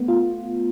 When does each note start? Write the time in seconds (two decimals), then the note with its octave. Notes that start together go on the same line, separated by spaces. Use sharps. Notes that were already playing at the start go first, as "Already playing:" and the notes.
Already playing: A3 B3
0.08 F4